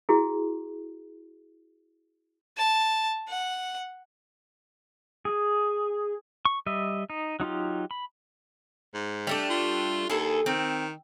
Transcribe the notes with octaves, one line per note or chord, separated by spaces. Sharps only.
E4 F#4 G#4
A5
F#5
G#4
C#6
G3 D#5 E5
D#4
F#3 D#4 F4 G4
B5
G#2
G3 A3 D4
F4
D#2 G#4 A4
D#3 C4